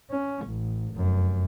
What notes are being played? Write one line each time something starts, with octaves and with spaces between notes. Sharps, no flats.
C#4
A1
F1 F#2